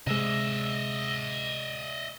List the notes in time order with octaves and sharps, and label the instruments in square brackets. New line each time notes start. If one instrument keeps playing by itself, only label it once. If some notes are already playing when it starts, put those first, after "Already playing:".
[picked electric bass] C3 G#3 [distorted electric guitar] D#5 E5